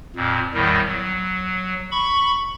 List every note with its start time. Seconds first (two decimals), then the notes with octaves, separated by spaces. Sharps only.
0.16 F2 A#2
0.54 E2 A2 D#3 G3
0.87 F#3
1.91 B5 C#6